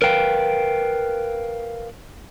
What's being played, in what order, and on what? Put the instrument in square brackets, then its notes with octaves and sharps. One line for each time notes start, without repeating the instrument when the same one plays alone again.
[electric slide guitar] A#4 B4 F5 G5